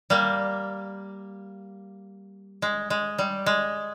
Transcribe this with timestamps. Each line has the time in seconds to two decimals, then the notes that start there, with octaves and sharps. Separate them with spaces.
0.10 G3 A#3
2.62 G#3
2.90 G#3
3.19 G3
3.46 G#3